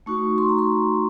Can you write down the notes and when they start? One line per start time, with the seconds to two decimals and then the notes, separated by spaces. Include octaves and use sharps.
0.06 A3 D#4 F#4 C#6
0.38 C6
0.49 A#5
0.58 C6